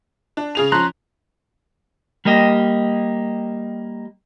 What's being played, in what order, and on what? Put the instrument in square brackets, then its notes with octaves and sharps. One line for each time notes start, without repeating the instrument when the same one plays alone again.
[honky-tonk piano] D4
C#3 G#4 F7
[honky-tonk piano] F3 C#4 [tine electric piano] A#5 C6 F#6
[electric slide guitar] G3 A#3 G4 D#5